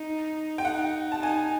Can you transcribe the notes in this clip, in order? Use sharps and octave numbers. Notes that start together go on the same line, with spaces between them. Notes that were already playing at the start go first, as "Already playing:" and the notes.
Already playing: D#4
G5
D#4 F#5
A5
D#4 G#5